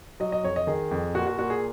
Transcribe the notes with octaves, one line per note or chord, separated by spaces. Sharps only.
F#3 D#5
D#5
F2 C#5
D#5
D#3 G#4
F2
A#2 F#4
F#4
A#2 F#4
G#4